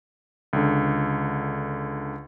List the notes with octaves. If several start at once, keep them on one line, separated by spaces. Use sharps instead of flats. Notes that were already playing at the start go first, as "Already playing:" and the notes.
C#2 D3